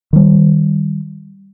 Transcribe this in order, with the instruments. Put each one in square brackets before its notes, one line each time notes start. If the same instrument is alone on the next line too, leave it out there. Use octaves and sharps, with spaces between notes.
[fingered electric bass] D#3 G3